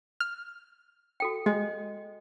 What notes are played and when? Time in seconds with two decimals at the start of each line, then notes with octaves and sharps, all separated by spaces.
0.20 F6
1.20 F#4 A4 G5
1.46 G#3 D#5